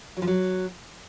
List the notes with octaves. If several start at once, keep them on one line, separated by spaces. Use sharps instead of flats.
F#3
F3
F#3